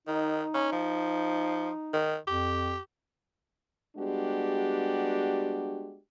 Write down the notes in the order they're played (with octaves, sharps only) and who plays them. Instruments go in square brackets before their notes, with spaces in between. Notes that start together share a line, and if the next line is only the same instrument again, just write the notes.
[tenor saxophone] D#3 [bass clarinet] D#4
[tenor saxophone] C#4
F3
D#3
[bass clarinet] F2 [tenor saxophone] G4
[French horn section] G3 G#3 B3 D4 F#4 G4